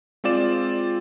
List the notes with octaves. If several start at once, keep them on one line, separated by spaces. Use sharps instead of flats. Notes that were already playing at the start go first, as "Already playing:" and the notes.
G#3 C4 F4 D5 E7